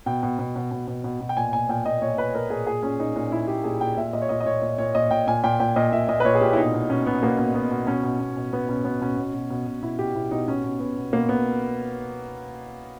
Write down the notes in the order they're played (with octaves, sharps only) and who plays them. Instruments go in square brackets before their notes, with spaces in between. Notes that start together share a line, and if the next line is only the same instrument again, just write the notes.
[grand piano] B2 G5
B2
B2
B2
B2
B2
B2
B2
G5
A#2 G#5
A#2 G#5
A#2 G5
A#2 D#5
A#2 C#5
A#2 B4
A#2 A#4
A#2 G#4
A#2 G#4
A#2 C#4
A#2 D#4
A#2 D#4
A#2 E4
A#2 G4
A#2 G#4
A#2 G5
A#2 E5
A#2 D#5
C#5
A#2 D#5
D#5
A#2 C#5
A#2
A#2 C#5
A#2 D#5
A#2 G5
A#2 G#5
A#2 G5
A#2 G5
A#2 D#5
A#2 E5
A#2 D#5
B4
A#2 C#5
G#4
A#2 G4
E4
B2 D#4
B2
B2 C#4
B2 B3
B2 A#3
B2
B2 B3
B2
B2 C#4
B2
B2
B2
B2 B3
B2 C#4
B2 B3
B2 C#4
B2
B2
B2
B2
B2 E4
B2 G4
B2 E4
B2 D#4
B2 C#4
B2
B2 B3
B2
B2 A#3
B2 B3